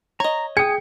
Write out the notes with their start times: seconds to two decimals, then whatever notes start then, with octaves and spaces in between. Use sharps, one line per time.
0.20 C#5 D#5 A#5
0.57 G#4 G5 G#5 D#6 C#7